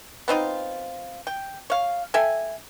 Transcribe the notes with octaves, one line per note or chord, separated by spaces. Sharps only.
B3 C4 D#4 F4
G5
C#5 F5
A4 E5 G5 G#5